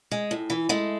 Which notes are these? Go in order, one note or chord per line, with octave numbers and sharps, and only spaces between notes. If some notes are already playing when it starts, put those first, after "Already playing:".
G#3
A2
E3
G#3 A3